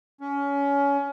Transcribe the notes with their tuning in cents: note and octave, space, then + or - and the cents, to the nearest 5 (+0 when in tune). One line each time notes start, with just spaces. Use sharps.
C#4 +25